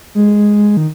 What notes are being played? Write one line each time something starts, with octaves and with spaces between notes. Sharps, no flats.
G#3
D#3